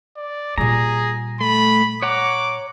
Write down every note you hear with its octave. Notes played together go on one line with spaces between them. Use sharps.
D5
A#2 G3 G#4 A#5
A3 B5
C#5 F#5 A#5 D6